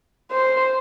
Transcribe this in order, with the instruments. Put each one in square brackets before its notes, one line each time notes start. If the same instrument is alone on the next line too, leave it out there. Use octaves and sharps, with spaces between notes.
[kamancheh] C5